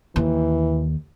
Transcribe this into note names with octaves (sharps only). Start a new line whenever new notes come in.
D#2 E3